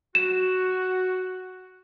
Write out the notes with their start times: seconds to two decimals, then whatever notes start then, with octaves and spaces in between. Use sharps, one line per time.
0.15 F#4 E7